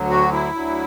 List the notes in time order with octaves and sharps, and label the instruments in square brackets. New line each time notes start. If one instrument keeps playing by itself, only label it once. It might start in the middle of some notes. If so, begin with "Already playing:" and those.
Already playing: [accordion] D2 D3 F#3
F#4
E4
D2 D3 F#3